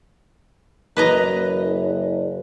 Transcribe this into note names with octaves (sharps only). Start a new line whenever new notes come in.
F#1 B4 D#5 A#5